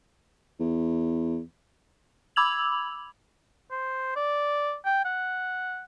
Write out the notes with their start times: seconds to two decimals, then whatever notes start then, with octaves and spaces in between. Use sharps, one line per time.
0.60 E2
2.36 B5 D6 E6 G#6 F7 F#7
3.71 C5
4.16 D5
4.85 G5
5.05 F#5